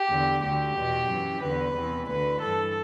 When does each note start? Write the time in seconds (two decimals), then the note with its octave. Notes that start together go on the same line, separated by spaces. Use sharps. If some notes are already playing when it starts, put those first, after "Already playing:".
Already playing: G4
0.10 E2 D3
0.42 D2 D3 G4
0.76 E2 B2
1.08 F#2 E3
1.42 E2 D3 B4
1.75 E2 C3 E3
2.07 D2 D3 B4
2.40 G2 E3 A4